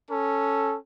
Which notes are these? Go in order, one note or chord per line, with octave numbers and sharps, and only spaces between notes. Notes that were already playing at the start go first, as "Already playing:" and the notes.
C#4 A4